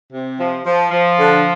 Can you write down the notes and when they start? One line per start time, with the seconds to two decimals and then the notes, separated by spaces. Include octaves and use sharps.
0.11 C3
0.38 F3
0.65 F3
0.91 F3
1.18 D3